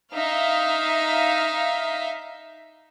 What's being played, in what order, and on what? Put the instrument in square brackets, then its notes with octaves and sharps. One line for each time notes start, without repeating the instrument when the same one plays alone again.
[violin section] D#4 E5 F5